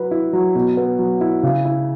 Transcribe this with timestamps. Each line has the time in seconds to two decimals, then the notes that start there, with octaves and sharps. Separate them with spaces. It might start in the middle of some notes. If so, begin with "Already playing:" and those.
Already playing: F#3 B4
0.11 E4
0.33 F#3
0.55 B2
0.77 B3
0.99 F#3
1.21 E4
1.43 C#3
1.65 E4